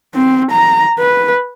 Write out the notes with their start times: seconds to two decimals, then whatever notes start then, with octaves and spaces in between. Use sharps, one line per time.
0.14 C4
0.52 A#5
0.99 B4